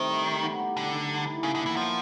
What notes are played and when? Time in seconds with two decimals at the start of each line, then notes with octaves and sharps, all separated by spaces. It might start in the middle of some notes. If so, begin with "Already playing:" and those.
Already playing: C3 D#3 A3 C4 D#4
0.09 G3
0.26 D#4
0.43 B3
0.60 G4
0.77 D3 G3
0.93 D#4
1.09 G3
1.26 E4
1.43 A#2 C#3
1.55 D3
1.60 B3
1.66 E3
1.76 F3 F#3